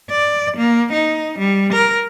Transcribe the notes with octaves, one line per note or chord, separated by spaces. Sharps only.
D5
A#3
D#4
G3
A#4